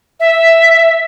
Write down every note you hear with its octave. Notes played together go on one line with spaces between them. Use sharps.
E5